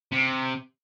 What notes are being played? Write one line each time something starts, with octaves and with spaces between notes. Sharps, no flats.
C3